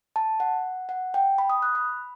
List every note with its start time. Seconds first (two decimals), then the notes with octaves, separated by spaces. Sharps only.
0.16 A5
0.40 F#5
0.89 F#5
1.14 G5
1.38 B5
1.50 D#6
1.62 F#6
1.75 B5